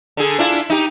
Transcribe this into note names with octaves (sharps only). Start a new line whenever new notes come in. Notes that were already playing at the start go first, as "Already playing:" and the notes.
D3 G#4
D4 E4 F4
D#4 G4